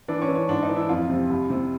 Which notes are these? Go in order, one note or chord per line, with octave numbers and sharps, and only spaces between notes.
E3 D4
C#4
E3
C#4
G#2 D4
D#4
E3
E4
F2 F4
C3
C2
C3